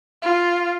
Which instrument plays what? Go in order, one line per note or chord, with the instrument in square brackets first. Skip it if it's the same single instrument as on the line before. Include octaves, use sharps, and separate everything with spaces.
[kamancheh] F4